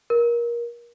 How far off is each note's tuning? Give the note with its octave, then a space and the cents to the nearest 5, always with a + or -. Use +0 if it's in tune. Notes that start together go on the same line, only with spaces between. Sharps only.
A#4 +25